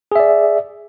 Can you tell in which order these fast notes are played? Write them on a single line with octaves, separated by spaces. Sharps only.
G#4 E5 D5